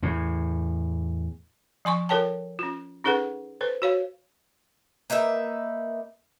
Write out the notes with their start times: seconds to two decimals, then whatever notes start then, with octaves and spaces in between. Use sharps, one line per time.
0.03 E2 A2
1.85 F3 G#5 C6 C#6
2.09 F4 A4 A#4 C#5 G5 A5
2.59 C#4 F4
3.04 C#4 D#4 G#4 A4 B4 F#5
3.61 A4 B4 C5
3.82 F#4 C#5 F5
5.10 A#3 D#4 B4 E5